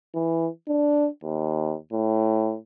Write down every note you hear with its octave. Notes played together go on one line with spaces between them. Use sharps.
E3
D4
D#2
A2